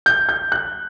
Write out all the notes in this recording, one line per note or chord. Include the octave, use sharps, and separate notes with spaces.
G6
G6
F#6